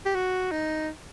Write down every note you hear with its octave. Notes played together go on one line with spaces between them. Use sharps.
G4
F#4
D#4